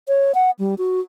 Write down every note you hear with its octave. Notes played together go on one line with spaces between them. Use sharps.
C#5
F#5
G3
F#4